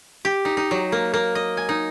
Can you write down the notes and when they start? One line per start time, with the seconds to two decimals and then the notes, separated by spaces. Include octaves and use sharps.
0.25 G4
0.45 D#4
0.57 D#4
0.71 F#3
0.92 A#3
1.14 A#3
1.35 D#5
1.57 G#5
1.69 D#4